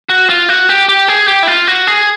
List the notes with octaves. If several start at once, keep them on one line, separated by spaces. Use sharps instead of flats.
F#4
F4
F#4
G4
G4
G#4
G4
E4
F4
F#4
G#4